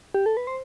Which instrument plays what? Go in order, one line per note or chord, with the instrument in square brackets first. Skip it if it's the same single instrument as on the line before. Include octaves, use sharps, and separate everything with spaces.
[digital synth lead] G4
A4
B4
C5